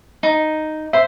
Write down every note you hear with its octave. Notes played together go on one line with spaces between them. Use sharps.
D#4
C5 E5